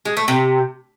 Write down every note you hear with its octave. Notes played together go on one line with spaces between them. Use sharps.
G#3
A3
C3